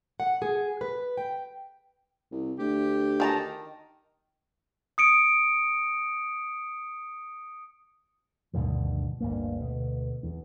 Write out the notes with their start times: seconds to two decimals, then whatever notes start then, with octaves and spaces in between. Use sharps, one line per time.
0.20 F#5
0.42 G#4
0.81 B4
1.17 G5
2.32 C2
2.59 D2 G4
3.20 D#3 A5 A#5
4.98 D#6 C#7 D7
8.54 D2 G2 B2 D#3
9.21 G1 D2 A#3
9.60 D2 B2
10.23 E2